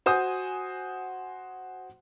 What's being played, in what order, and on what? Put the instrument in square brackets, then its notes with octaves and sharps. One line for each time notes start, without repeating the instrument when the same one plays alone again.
[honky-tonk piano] F#4 C5 G#5 D#6